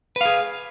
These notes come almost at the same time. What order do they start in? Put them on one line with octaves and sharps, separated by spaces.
B4 F5 G#4